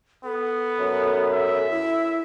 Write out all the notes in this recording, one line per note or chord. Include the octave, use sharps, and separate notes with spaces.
B3 A4
F#2
E5
E4